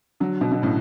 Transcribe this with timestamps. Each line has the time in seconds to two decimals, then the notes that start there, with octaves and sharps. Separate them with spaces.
0.20 D3 F#3
0.41 B2 D3
0.52 B2 D3
0.62 A2 C#3